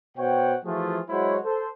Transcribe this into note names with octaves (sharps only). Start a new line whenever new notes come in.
B2 C5 C#5 F#5 G5
E3 F3 A3 F4 F#4 G#4
F#3 G#3 E4 F#4 C5 C#5
A4 C5